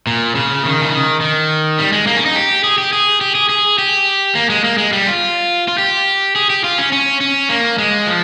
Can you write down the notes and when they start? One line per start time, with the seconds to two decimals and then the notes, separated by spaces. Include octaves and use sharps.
0.07 A#2
0.35 C#3
0.64 D#3
0.81 C#3
0.92 D#3
1.21 D#3
1.78 G3
1.92 G#3
2.07 A#3
2.16 C#4
2.26 D#4
2.35 G4
2.64 G#4
2.78 G4
2.93 G#4
3.21 G4
3.35 G#4
3.49 G#4
3.78 G4
4.35 A#3
4.50 G#3
4.64 A#3
4.78 G#3
4.93 G3
5.07 F4
5.68 F4
5.78 G4
6.35 G#4
6.50 G4
6.64 F4
6.78 C#4
6.92 C#4
7.21 C#4
7.49 A#3
7.78 G#3
8.07 F3